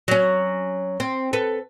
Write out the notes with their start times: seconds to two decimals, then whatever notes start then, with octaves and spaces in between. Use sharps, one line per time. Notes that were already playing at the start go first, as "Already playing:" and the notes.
0.08 F#3 C#4
1.00 C4
1.33 A4 B4